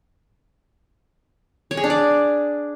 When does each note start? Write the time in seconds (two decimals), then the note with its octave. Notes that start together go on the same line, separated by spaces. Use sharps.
1.71 C#5
1.77 G#4
1.84 D4
1.90 D5